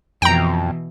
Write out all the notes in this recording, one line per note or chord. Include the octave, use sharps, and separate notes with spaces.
F2 B2 E3 G5 A#5